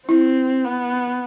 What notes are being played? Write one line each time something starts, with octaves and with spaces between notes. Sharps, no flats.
C4 E4
B3